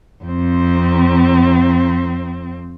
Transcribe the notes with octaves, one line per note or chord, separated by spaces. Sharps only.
F2 C4